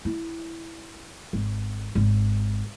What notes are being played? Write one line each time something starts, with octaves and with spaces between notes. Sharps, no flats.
E4
G#1
G#1